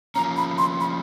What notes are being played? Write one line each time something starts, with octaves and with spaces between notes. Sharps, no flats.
F3 A#3 C#4 A#5
B5
C6
B5